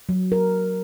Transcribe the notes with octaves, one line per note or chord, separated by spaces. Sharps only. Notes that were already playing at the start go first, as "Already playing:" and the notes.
F#3
A#4